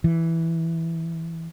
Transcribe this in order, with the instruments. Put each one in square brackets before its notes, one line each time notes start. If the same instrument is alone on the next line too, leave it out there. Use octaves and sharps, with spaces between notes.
[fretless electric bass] E3